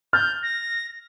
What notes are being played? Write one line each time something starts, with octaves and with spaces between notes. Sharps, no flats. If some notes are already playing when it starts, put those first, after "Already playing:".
F6 G6 A6
A#6